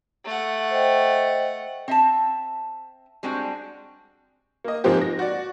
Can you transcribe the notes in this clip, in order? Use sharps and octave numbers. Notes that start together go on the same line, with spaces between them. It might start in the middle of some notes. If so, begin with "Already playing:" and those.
A3 F#5
C5 D#5 G5
C4 E5 A5
G3 G#3 C4 D4 F#4
A#3 D#5
G#2 F3 G#3 A#3 C4 G4
A#6
F#4 D5